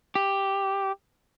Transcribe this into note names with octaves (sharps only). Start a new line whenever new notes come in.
G4